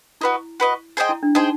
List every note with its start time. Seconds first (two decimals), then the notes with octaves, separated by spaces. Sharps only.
0.21 E4 F#4 B4 D#5
0.60 F#4 B4 D#5
0.97 G#4 C5 D#5 G5
1.09 E4
1.23 D4
1.35 D#4 G#4 C5 D#5 G5